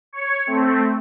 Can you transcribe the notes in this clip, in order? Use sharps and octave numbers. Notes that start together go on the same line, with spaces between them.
C#5 C#7
A3 C4